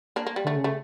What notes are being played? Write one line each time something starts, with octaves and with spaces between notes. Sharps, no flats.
A#3 D4
A#3
G3
D3 A3
C#3
A3